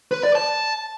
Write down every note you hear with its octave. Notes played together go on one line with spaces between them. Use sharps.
B4
D5
A5